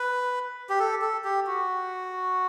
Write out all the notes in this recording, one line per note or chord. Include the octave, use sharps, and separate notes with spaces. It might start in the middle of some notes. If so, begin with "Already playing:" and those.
Already playing: B4
G4
A4
A4
G4
F#4